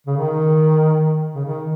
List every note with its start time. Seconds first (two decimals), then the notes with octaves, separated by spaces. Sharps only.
0.06 C#3
0.17 D#3
1.34 C#3
1.45 D#3